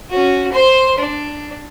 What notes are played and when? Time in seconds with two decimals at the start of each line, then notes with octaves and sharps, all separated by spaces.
0.11 C#4 F#4
0.52 C5 C6
0.98 D4